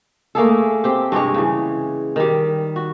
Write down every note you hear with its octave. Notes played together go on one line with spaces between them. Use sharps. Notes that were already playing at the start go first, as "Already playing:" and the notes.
A3 A#3 G#4 A4
C4 G4
G2 C3 G#3 C#5
C#3 E3
D#3 G3
F#4